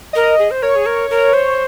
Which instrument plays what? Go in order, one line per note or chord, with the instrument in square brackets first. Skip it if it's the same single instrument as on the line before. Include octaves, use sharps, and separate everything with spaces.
[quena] A#4 [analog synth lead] D#5
[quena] G#4
C5
[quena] A#4 [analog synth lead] C#5
[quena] G#4
A#4
A#4
C5